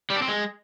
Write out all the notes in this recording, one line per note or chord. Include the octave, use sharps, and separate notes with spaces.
G3
D4
C4
G#3